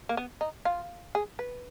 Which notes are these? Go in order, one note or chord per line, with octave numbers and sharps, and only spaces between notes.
A#3
B3
D#4
F4
G#4
B4